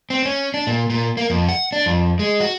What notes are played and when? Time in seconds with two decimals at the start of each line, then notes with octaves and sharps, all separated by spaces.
0.10 C4
0.25 C#4
0.54 D4
0.67 A#2
0.90 A#2
1.17 A#3
1.30 F2
1.49 F#5
1.72 D4
1.86 F2
2.19 G#3
2.40 F#4